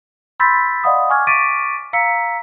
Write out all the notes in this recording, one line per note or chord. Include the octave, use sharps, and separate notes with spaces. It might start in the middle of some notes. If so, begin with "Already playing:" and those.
B5 C6 E6 G6 A6 B6
D5 D#5 F5 F#5 B5 D#6
G#5 C#6 D6 F6 G#6
C#6 D6 A6 B6 D7 D#7
F5 A#5 E6 B6 C#7